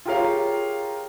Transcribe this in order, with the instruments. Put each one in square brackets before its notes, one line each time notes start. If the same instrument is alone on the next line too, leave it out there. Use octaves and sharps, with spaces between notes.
[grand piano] F4 G4 G#4 A#4 C#5 F5